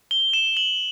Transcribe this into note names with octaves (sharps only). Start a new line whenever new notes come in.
G7
E7
F#7